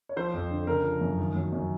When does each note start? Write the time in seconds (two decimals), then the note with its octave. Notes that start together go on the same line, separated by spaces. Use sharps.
0.09 C#5
0.16 F3 C5
0.34 F2
0.51 D3
0.67 C#3 A#4
0.84 F3
1.01 F#2
1.19 D#3
1.35 F#3
1.52 F#2